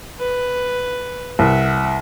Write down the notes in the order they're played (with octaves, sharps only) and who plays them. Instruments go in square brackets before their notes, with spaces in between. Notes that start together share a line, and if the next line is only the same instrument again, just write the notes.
[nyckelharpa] B4
[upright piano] C2 [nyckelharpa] E5 F#5